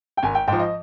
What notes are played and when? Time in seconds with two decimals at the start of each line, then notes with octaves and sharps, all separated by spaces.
0.17 G5
0.23 G#1 G#5
0.35 G5
0.47 G#2 F3 G5
0.59 D#5